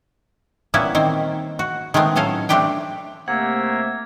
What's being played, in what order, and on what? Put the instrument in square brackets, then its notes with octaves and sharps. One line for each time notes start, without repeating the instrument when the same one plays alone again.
[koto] A#2 G3 A#3 B3 C#4 E4
D#3 C4 C5
F#4
D#3 G#3 A3 B3 C4
A2 F#3 C#4 A4 D#5 F5
A3 C4 D4 G4 B4 G5
[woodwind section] C3 A3 E5 [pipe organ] A#3 [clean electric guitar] F#5 [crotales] G#6